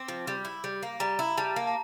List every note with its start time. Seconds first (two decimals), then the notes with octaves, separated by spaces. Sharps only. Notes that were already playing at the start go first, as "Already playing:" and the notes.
Already playing: C4 D6
0.08 F3
0.27 G3
0.45 E4
0.64 G3
0.83 A#3
1.00 G3 A#5
1.19 E4
1.37 G3 A5
1.56 A#3
1.67 A5